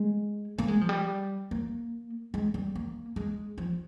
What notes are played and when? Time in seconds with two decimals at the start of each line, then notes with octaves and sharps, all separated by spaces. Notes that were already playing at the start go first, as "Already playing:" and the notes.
Already playing: G#3
0.58 A#3
0.68 G#3
0.81 F3
0.89 G3
1.51 A#3
2.34 G#3
2.54 G3
2.75 A#3
3.16 G#3
3.58 F3